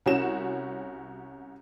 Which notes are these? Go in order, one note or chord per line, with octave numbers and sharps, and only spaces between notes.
C2 C#4 F#4 E7